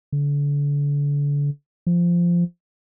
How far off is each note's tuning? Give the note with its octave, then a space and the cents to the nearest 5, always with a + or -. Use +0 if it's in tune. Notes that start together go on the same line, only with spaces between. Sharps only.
D3 -35
F3 -10